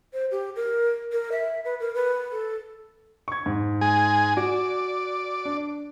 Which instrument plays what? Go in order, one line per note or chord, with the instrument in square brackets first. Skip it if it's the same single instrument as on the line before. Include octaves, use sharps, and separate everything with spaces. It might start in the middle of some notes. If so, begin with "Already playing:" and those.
[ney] C5
G4
A#4
A#4
E5
B4
A#4
B4
A4
[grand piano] C#6 G#6
G#2
[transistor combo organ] G#3 G#4
[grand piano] F#4 [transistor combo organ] D5
[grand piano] D4